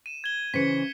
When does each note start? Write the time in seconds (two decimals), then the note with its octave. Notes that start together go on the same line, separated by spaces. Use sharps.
0.06 D#7 E7
0.24 G#6 G7
0.54 C#3 E3 C5 B6 C#7